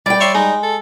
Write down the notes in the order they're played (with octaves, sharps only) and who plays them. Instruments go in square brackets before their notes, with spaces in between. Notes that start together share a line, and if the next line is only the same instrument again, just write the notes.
[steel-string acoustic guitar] G3 G5 [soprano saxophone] D5
[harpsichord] C#5 E5 C6
[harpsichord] G#3 [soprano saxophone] D#4
[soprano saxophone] A4